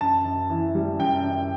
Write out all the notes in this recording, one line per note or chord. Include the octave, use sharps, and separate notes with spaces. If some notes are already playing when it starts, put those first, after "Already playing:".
F#2 A5
F#2
E3
G3
F#2 G5
F#2